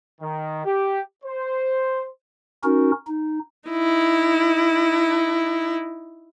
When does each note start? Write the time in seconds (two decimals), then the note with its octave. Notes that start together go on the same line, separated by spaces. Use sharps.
0.21 D#3
0.65 G4
1.24 C5
2.64 C#4 D#4 F#4 A#4
3.07 D#4
3.69 D#4 E4